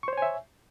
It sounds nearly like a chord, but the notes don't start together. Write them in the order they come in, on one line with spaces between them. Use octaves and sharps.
C#6 C5 C#5 G#5 E5